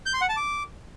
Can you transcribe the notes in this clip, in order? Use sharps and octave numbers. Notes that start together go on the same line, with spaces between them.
G6
C6
F#5
A5
D6